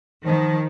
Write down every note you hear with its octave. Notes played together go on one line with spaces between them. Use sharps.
D#3 F3